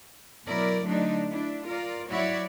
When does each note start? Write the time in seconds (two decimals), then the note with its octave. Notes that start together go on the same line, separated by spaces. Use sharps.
0.46 B2 F#3 E4 A#4 D5
0.84 D3 F#3 A3 D4 D#4
1.29 D4 E4
1.64 F4 A#4 D5
2.09 F#3 E4 F#4 C#5 D5 E5